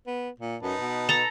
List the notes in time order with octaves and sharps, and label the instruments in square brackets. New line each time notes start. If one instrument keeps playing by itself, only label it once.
[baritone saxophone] B3
A#2
[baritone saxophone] F#2 [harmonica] D#4 B4 A5
[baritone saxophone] B2
[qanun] A4 A#5